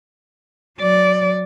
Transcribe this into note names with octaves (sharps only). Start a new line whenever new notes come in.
F#3 D5